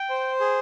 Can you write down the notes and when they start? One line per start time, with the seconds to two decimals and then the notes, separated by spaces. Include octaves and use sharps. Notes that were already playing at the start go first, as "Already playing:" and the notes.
Already playing: G5
0.09 C5
0.40 G#4